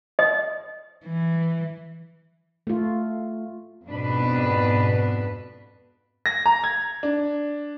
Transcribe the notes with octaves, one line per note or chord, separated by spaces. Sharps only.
D#5
E3
A3 F4
F2 G#2 B2 D4 B4
A#6
A#5
G#6
D4